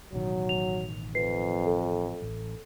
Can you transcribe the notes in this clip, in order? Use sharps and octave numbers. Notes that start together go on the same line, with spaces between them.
A1 B2 D#3 F#3
F7
F2 B4 C7
A4
A1